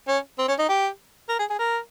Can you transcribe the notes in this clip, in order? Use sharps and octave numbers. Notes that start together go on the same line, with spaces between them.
C#4
C4
C#4
D#4
G4
A#4
G#4
G#4
A#4